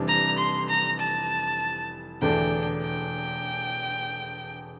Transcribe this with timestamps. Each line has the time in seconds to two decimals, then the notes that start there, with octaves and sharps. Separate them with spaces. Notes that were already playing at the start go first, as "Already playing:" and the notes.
Already playing: F1 F2 E3 G3 D4
0.08 A#5
0.38 C6
0.69 A#5
1.00 A5
2.22 E1 E2 D3 A3 D4 G5
2.83 G5